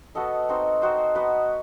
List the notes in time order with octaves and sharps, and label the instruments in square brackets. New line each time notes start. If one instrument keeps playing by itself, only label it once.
[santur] B3 F#4 A4 D#5
C4 D#4 F#4 C5
C4 D#4 F#4 C5
B3 F#4 B4 D#5